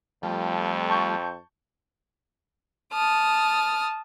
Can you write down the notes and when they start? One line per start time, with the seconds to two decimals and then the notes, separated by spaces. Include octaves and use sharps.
0.23 F2 F3 G3 A3
0.89 A5 C#6 G6
2.93 A5 D#6 F6